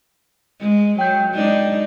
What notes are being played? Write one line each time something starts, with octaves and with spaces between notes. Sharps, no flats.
G#3
F#3 G5 G6
G#3 D4 D#4